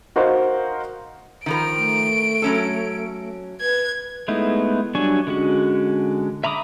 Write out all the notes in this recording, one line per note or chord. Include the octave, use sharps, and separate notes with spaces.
D#4 F#4 A#4 C5 F5
D#3 F3 A#4 D7
A3
F#3 C#4 A4
B4 G#6
G#3 A3 B3 D#4 E4
F#3 G3 D4 G#5 C#6
D3 G#3 C#4 F#4
E5 A#5 B5 D6 D#6